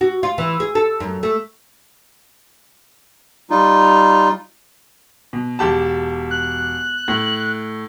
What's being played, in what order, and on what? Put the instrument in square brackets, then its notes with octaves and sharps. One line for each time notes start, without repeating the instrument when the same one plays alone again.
[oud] F#4
F4
E3
G#4
A4
F#2
A3
[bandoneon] G3 D#4 F4
[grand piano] B2
E1 G4 A5
[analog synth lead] F#6
[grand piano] A2